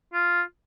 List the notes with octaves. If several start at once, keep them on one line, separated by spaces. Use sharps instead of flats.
F4